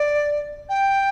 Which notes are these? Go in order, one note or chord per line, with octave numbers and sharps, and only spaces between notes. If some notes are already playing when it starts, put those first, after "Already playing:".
Already playing: D5
G5